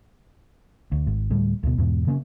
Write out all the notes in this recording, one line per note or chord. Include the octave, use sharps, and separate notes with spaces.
D2
G#1
D2 A2 G3
D2 B2
E2 G#2 B2
C#3 A#3 B3 C#4